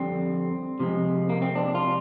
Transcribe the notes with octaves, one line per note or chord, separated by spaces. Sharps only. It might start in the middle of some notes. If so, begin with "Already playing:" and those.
Already playing: F2 D3 G3 C4
C3 F3 G#3
A#3
C4
D4
F4